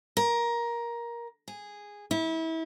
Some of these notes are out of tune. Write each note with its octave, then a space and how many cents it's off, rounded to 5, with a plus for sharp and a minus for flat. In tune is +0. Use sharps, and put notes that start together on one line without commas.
A#4 +15
G#4 -10
E4 -30